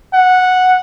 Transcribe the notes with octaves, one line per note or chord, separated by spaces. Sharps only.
F#5